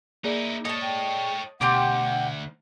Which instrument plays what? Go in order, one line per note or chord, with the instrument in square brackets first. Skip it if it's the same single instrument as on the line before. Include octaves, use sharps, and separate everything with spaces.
[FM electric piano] A#3 G#4 D5 [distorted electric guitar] D#4 E4
[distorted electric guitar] A4 C#5 [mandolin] D#5 A5
[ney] G5
[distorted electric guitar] D2 [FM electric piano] B2 [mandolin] G4 C6 D6 [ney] F#5